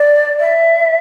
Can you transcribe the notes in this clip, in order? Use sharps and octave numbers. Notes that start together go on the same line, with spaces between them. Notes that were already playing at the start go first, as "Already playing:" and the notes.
Already playing: D5
E5